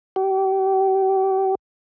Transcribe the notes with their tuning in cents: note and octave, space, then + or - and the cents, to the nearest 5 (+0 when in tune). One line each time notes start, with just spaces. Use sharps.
G4 -35